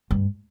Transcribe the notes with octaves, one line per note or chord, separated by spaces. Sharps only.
G2